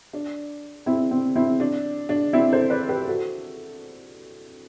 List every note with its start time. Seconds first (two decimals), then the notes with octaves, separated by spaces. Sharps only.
0.13 D4
0.86 C4 E4
1.11 C4
1.35 C4 E4
1.60 D4
2.09 D4
2.33 C4 E4
2.53 A4 C5
2.70 B4 D5
2.89 G4 B4
3.08 F#4 A4